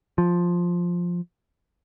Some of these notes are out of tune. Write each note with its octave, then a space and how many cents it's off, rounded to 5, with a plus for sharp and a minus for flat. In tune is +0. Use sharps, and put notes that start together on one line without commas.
F3 +5